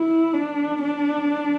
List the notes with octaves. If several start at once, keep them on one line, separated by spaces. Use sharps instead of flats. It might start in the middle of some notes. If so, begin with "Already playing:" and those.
Already playing: E4
D4
D4